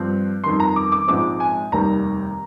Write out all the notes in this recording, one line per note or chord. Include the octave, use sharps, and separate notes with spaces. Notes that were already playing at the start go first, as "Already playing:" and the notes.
Already playing: G2 F3 C4
F2 D#3 G3 C6
A#5
D6
D6
A#1 G#2 F3 G#3 C4 D6
G#5
F1 D#2 D#3 G3 A#5